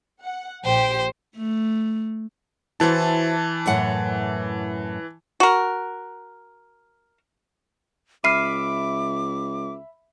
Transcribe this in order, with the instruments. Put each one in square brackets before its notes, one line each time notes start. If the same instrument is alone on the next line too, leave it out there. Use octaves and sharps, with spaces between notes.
[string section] F#5
[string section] A#1 G4 G5 [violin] C5
[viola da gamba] A3
[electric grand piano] E3 A5 [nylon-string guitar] E4 F#4 C5
[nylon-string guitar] F#2 A2 F#5
[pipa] F#4 A#4
[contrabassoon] C#2 [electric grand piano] E5 B5 [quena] D6 [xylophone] F6 C7 D#7